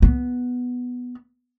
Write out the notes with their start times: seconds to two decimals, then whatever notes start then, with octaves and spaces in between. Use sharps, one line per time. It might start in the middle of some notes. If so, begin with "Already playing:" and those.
0.02 B3